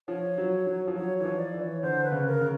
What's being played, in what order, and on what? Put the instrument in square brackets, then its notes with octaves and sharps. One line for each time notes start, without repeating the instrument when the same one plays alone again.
[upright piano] F3 [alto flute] C#5
[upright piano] F#3
F#3
F3
[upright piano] F#3 [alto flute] C#5
[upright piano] E3 [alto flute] C#5
[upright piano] F3
[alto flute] D5
[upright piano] E3
[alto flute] C#5
[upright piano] D3 [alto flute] C5
[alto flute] B4
[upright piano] C#3
[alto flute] A#4
[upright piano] C#3